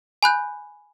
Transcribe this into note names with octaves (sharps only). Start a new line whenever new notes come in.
G#5 B5 F#6 G6